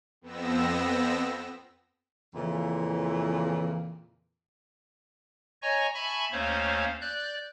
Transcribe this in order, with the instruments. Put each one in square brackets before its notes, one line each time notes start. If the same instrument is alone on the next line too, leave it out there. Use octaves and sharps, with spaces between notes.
[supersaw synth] F2 B3 C4 E6 A#6
[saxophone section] F2 A#2 C#3 E3
[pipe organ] C#5 D#5 G#5 A#5 C#6
E5 G#5 A5 B5 C#6
D#2 A3 C#4 C5 C#5 F5
D5 F#6 G6